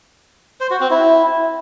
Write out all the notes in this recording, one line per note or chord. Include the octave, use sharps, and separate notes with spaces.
C5
F#4
C4
E4